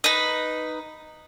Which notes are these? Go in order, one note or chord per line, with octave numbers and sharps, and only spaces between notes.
D#4 B4